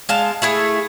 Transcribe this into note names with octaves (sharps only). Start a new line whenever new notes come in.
G#3 F5 A5
A3 E4 G#4